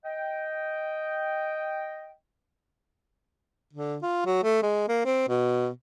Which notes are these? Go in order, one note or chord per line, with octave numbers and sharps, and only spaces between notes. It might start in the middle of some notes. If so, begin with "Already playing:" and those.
D#5 G5
D3
F4
F#3
A3
G#3
A#3
C4
B2